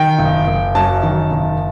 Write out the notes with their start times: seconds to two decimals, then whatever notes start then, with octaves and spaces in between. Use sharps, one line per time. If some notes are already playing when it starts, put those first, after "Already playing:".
Already playing: D#3 G5
0.19 F#1
0.47 F#1
0.75 F#2 A5
1.03 D#3
1.31 F#1